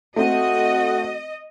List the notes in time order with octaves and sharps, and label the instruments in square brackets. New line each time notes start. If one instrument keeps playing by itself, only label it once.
[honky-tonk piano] A3 C4 [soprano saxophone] F#4 [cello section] D#5